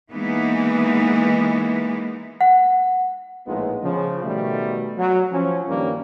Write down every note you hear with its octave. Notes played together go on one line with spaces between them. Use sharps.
E3 G#3 A#3 B3 D#4
F#5
A#1 A2 G#3 B3 D#4 F4
C#3 F3
B2 D#3 G3 A3
F#3
F3 C#4
G2 D#3 G3 A#3 C#4 D4